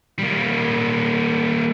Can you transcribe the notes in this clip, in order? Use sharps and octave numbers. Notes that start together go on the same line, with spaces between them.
G3 A#3